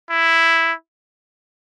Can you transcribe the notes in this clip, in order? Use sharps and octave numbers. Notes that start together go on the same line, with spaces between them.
E4